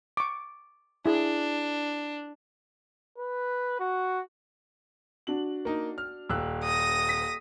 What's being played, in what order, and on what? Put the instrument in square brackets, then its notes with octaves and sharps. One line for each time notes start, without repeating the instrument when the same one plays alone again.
[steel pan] C#6 D6
[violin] D4 [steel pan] E4 G#4
[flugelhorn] B4
F#4
[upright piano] D4 F#4 F#7
[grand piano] A#3 D#4
F6
[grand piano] D#1 F#6 [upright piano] E6
[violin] D#6 A#6
[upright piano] B6